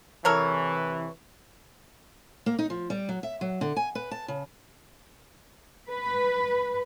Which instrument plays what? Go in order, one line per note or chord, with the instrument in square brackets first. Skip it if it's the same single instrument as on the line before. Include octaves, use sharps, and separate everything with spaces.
[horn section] C3 E3 [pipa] A4 A#4 C#5
[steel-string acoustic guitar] A#3
D#4
F3
G3
F#3
E5
F#3
D3
G#5
B4
A5
C#3
[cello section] B4